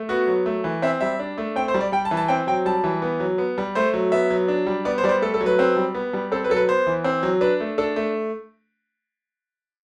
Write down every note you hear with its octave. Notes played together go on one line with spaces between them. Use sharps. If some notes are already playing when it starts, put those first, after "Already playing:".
Already playing: A3
B3 F#4
F#3
A3
E3
C4 E5
G3 E5
D4
A3
C4 G5
C5
G3
D5
G3 G5
A5
E3
A5
C4 G5
F#3 G5
G3 A5
E3
B3
F#3
B3
G3
A3 C5
F#3
B3 E5
F#3
D4
G3
B3 D5
C5
G3 D5
C5
A3 A4
A4
F#3
B4
C4
G3
B3
G3
C4 A4
B4
F#3 A4
B4
B3 C5
E3
C4
F#3
D4 B4
A3
D4 A4
A3